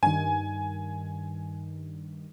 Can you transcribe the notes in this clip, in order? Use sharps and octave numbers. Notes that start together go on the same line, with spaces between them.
G2 D#3 G#5